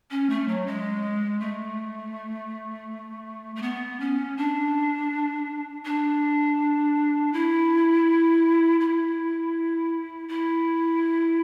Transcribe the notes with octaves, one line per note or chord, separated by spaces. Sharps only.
C#4
A3
F#3
G#3
A3
A3
B3
C#4
D4
D4
E4
E4
E4